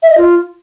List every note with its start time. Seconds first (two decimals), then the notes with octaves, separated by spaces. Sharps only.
0.03 E5
0.10 D#5
0.17 F4